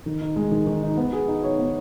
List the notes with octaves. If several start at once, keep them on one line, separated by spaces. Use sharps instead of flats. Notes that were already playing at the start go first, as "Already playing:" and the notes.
D#3
D#4
G#3
D#3
D#3
D#4
B3
G#4
D#4
C#5
B3